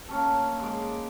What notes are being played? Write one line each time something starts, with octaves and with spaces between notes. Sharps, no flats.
A#3 C#4 A4
G#3 D6